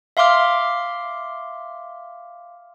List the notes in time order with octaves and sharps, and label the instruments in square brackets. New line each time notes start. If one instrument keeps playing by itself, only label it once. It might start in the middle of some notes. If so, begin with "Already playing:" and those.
[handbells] E5 F5 C6 D6 F6